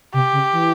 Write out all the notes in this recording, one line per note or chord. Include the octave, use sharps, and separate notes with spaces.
C3 G4
C#3
E3